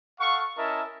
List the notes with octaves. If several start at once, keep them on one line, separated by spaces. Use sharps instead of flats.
A4 F5 F#5 C#6
C#4 E4 A#4 D#5 E5 A5